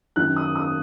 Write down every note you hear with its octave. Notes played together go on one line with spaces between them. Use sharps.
F#2 D#3 F#6
D#6
D#6